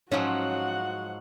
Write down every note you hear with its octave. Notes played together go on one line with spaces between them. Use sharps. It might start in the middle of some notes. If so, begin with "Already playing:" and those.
G#2 F3 F#3 C#4 F#4 F#5